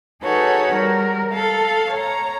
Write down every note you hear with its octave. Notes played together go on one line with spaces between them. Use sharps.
D#4 F#4 G#4 A4 B4 C#5
G3 A#4
A4 F5
C#5 A#5